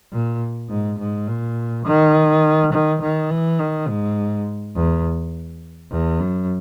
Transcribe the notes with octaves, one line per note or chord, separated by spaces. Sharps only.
A#2
G#2
G#2
A#2
D#3
D#3
D#3
E3
D#3
G#2
E2
E2
F#2